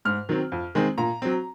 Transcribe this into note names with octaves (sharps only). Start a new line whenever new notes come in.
G#2 F6
D#3 F#3 C4
F2
D#3 G#3 C4
A#2 A#5
F#3 C4